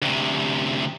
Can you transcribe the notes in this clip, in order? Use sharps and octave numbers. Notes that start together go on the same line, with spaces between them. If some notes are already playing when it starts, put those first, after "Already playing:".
D2 C3